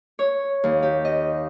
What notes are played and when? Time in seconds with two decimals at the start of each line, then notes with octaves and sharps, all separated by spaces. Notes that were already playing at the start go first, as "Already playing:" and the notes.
0.19 C#5
0.64 D#2
0.83 G4
1.05 D#5